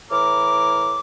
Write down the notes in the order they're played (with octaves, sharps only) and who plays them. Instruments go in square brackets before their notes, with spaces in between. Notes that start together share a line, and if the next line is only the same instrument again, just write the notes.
[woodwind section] A2 E3 A#4 D6